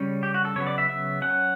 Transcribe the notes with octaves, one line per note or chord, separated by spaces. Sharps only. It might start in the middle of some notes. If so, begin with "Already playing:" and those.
Already playing: C#3 G3 C#4
G4
F#4
A4
C#3 F#3 B3 C#5
D5
E5
E5
F#3 C#4 F#5